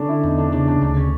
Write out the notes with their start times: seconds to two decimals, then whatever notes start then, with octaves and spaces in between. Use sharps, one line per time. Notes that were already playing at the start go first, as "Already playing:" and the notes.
Already playing: D3 C#4 D4
0.09 E4
0.23 E2 D#4
0.38 D4
0.52 C#3 D4
0.68 D4
0.82 D2 D4
0.97 C#4